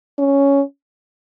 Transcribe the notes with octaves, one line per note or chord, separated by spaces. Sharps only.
C#4